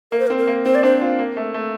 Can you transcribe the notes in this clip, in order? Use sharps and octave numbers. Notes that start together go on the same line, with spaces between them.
A#3 A#4
C5
A#4
C4
A#4
A#3
C4 C5
D5
D4 C5
F4
A#3
A3
A3